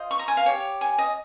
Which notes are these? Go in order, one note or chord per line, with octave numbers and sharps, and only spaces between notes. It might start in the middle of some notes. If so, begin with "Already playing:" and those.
Already playing: F4 C5 D#5
C#6
A#5
G#5
F5
G4 C#5
G#5
D#5